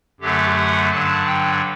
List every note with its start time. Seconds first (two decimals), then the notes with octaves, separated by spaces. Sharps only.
0.20 F#2 D3 F#3 A3 G4
0.56 F#5
0.91 G2 D3 F#3 A5
1.27 G5